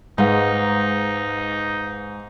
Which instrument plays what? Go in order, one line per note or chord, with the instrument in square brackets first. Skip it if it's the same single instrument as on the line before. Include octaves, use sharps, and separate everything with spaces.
[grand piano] G#2 [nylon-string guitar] G#3 [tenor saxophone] D#4 [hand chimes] B4 F5 F#5